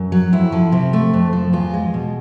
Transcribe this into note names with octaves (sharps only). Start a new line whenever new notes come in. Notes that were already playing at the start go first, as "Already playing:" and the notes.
Already playing: F#2
F#3
F2 E4
F3
C3
A3
F2
F3
E2 F4
G#3
B2